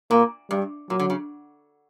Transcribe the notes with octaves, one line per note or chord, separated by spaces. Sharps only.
A#2 A#3
G2 G3
A#2 F#3
D3
C#3